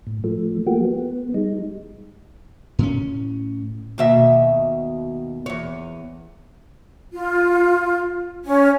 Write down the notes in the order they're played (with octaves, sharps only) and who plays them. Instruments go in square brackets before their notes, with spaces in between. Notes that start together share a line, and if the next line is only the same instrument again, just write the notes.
[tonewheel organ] A2
F3 A3
F3 A3 A#3 F#4 G4
B3
G3 G#3 D#4
[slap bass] A2 C#4
[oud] D#2 B2 E5
E2 C#5
[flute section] F4
C#4